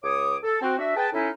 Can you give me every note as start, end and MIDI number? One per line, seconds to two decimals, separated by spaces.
0.03 0.36 37
0.03 0.36 73
0.03 0.36 86
0.03 0.36 87
0.43 0.57 69
0.61 0.77 60
0.61 0.77 66
0.78 0.96 62
0.78 0.96 66
0.78 0.96 76
0.96 1.08 68
0.96 1.08 71
0.96 1.08 79
0.96 1.08 81
1.13 1.29 45
1.13 1.29 61
1.13 1.29 63
1.13 1.29 64